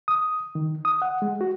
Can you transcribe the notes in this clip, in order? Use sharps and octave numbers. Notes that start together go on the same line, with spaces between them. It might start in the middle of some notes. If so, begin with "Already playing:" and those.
D#6
D#3
D#6
F#5
G#3
F#4